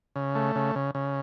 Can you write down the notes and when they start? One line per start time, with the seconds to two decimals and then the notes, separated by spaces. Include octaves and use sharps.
0.16 C#3
0.35 A3
0.56 C#3
0.75 C#3
0.95 C#3